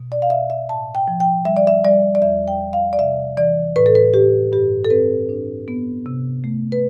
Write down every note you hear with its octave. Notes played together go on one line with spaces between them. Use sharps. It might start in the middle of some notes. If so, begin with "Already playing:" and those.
Already playing: B2
D5
F5
B2 E5
E5
A2 A5
G5
F3
G5
G3 E5
D5
E5
G3 D5
D5
E2 E5
G5
E2
F5
D5
C3 E5
E3 D5
A2 B4
A4
B4
A2 G4
G2 G4
A4
C4 B4
D4
B3
C3
A3
B4